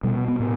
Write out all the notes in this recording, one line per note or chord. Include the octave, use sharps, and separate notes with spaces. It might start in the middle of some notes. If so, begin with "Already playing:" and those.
B2 G3
B3
B3
A2 B3